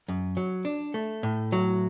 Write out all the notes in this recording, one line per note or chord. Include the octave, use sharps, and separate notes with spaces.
F#2
F#3
D4
A3
A2
F#3